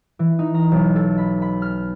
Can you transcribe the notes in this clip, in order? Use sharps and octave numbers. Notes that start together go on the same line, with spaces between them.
E3
D#4
A#5
B1
A4
B5
B5
F6